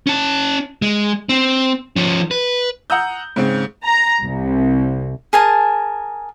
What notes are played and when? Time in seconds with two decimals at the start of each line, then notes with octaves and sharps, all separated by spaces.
0.07 C#4 A5
0.82 G#3
1.29 C4
1.96 F3 C#4
2.31 B4
2.90 F#5 A#5 D#6 E6 G6
3.36 G#2 C#3 C4
3.87 A#5
4.24 C2
5.33 G#4 A#4 G#5 A5